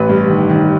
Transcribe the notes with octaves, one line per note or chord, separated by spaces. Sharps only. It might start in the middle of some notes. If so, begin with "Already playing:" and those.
Already playing: A1 B4
G2
D#3
D#3